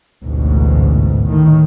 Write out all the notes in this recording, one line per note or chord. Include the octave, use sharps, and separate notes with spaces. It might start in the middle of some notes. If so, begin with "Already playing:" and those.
A1 D2 G#2 B2
A2 D#3